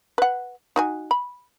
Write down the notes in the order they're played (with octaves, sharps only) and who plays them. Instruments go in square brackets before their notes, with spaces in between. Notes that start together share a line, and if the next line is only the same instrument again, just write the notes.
[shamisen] B4 F#5
D#4 F#4 G#5
B5